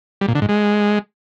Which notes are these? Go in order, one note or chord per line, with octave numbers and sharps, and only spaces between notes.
G3
A#2
D3
G#2
G#3